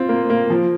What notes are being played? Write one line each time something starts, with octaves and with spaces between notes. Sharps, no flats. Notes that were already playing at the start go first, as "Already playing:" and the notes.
Already playing: C4 F4
A#3
A#3
F3